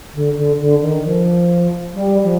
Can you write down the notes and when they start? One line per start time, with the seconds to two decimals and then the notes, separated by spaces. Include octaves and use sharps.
0.14 D3
0.36 D3
0.60 D3
0.82 D#3
1.04 F3
1.94 G3
2.23 F3